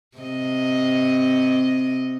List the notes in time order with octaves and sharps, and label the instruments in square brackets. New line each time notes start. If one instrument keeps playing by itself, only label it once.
[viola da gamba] C3 D#5